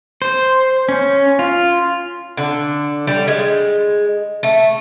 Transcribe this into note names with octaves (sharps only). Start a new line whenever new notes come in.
C5
C#4
F4
D3
G3
G#3
A3